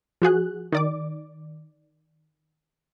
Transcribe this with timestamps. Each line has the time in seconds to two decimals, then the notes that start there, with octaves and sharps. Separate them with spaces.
0.22 F3 F#4 G#4 F#6
0.72 D#3 D5 D6